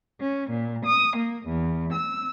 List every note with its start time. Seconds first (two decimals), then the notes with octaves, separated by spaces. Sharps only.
0.20 C#4
0.50 A#2
0.85 D#6
1.16 A#3
1.45 E2
1.93 E6